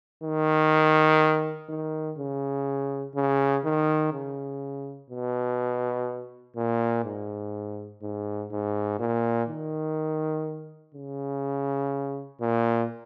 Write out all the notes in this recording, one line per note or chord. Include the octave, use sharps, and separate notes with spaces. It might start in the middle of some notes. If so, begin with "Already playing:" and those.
D#3
D#3
C#3
C#3
D#3
C#3
B2
A#2
G#2
G#2
G#2
A#2
D#3
C#3
A#2